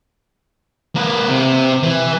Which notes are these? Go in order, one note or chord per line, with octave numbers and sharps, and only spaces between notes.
A#3 B4
C3
E3